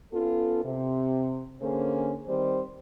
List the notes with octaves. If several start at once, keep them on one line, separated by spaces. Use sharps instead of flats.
B3 C#4 F4 A4
C3
D3 A#3 C#4 G#4 C5
D#3 G3 C4 C5